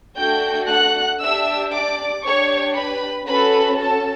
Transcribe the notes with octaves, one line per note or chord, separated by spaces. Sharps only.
A3 D4 F#4 A4 G5 G6
F#5 F#6
D4 G4 E5 E6
D5 D6
D4 G4 C#5 C#6
B4 B5
C#4 F#4 A4 B4 B5
A4 A5